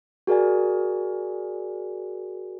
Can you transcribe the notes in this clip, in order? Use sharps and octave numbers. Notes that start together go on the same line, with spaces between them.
F#4 G#4 A#4 D5 G#5